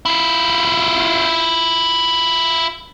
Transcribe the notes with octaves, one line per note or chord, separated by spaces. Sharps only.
E4 F4